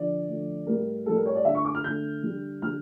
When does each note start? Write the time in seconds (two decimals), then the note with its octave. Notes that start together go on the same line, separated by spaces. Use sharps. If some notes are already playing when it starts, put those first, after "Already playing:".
Already playing: D3 F3 D5
0.28 D3 F3 A3
0.67 A2 G3 A#4
1.06 A2 G3 A4
1.16 A#4
1.26 C#5
1.35 D5
1.45 D3 A3 E5
1.55 C#6
1.65 D6
1.75 F6
1.84 D3 A3 G6
2.23 D3 G3
2.62 D3 G3 F6